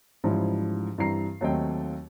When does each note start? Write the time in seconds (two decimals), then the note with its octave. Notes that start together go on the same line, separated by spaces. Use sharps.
0.24 G#2 E3 F3 G3 C#4 E4
0.98 G2 E3 G3 C4 A#5 C7
1.41 D#2 F#3 A3 C4 D#5 G5